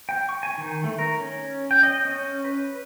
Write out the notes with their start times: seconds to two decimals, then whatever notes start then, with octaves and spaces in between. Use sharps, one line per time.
0.09 G5
0.29 C#6
0.43 G#5
0.58 D#3
0.84 A3
0.99 A#4
1.20 C#4
1.71 G5
1.83 D#5
2.05 C#4
2.45 B4